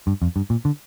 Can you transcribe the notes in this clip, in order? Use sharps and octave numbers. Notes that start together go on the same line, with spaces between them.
G2
F2
G2
A#2
D3